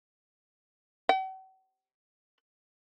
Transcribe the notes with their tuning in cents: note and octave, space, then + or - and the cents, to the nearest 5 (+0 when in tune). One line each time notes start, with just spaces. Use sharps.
F#5 +45